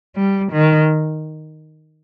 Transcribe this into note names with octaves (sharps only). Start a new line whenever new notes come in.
G3
D#3